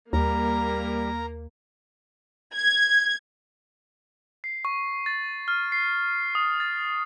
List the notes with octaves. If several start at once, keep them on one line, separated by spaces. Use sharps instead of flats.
D#2 G3 A#3 A#4 A#5
G#6
C7
C#6
A6
F6
C7
D#6
A6